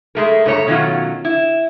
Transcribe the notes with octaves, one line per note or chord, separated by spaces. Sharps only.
G#3 A3 A#4
G2 A3 C#5 A#5
B2 D#3 F#3 C#4 F4
E4